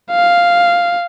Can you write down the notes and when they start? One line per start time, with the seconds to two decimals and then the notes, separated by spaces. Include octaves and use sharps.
0.11 F5